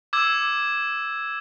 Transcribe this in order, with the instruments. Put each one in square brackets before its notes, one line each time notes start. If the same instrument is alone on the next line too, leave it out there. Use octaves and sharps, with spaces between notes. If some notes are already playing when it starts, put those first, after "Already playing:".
[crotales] D6 E6 G#6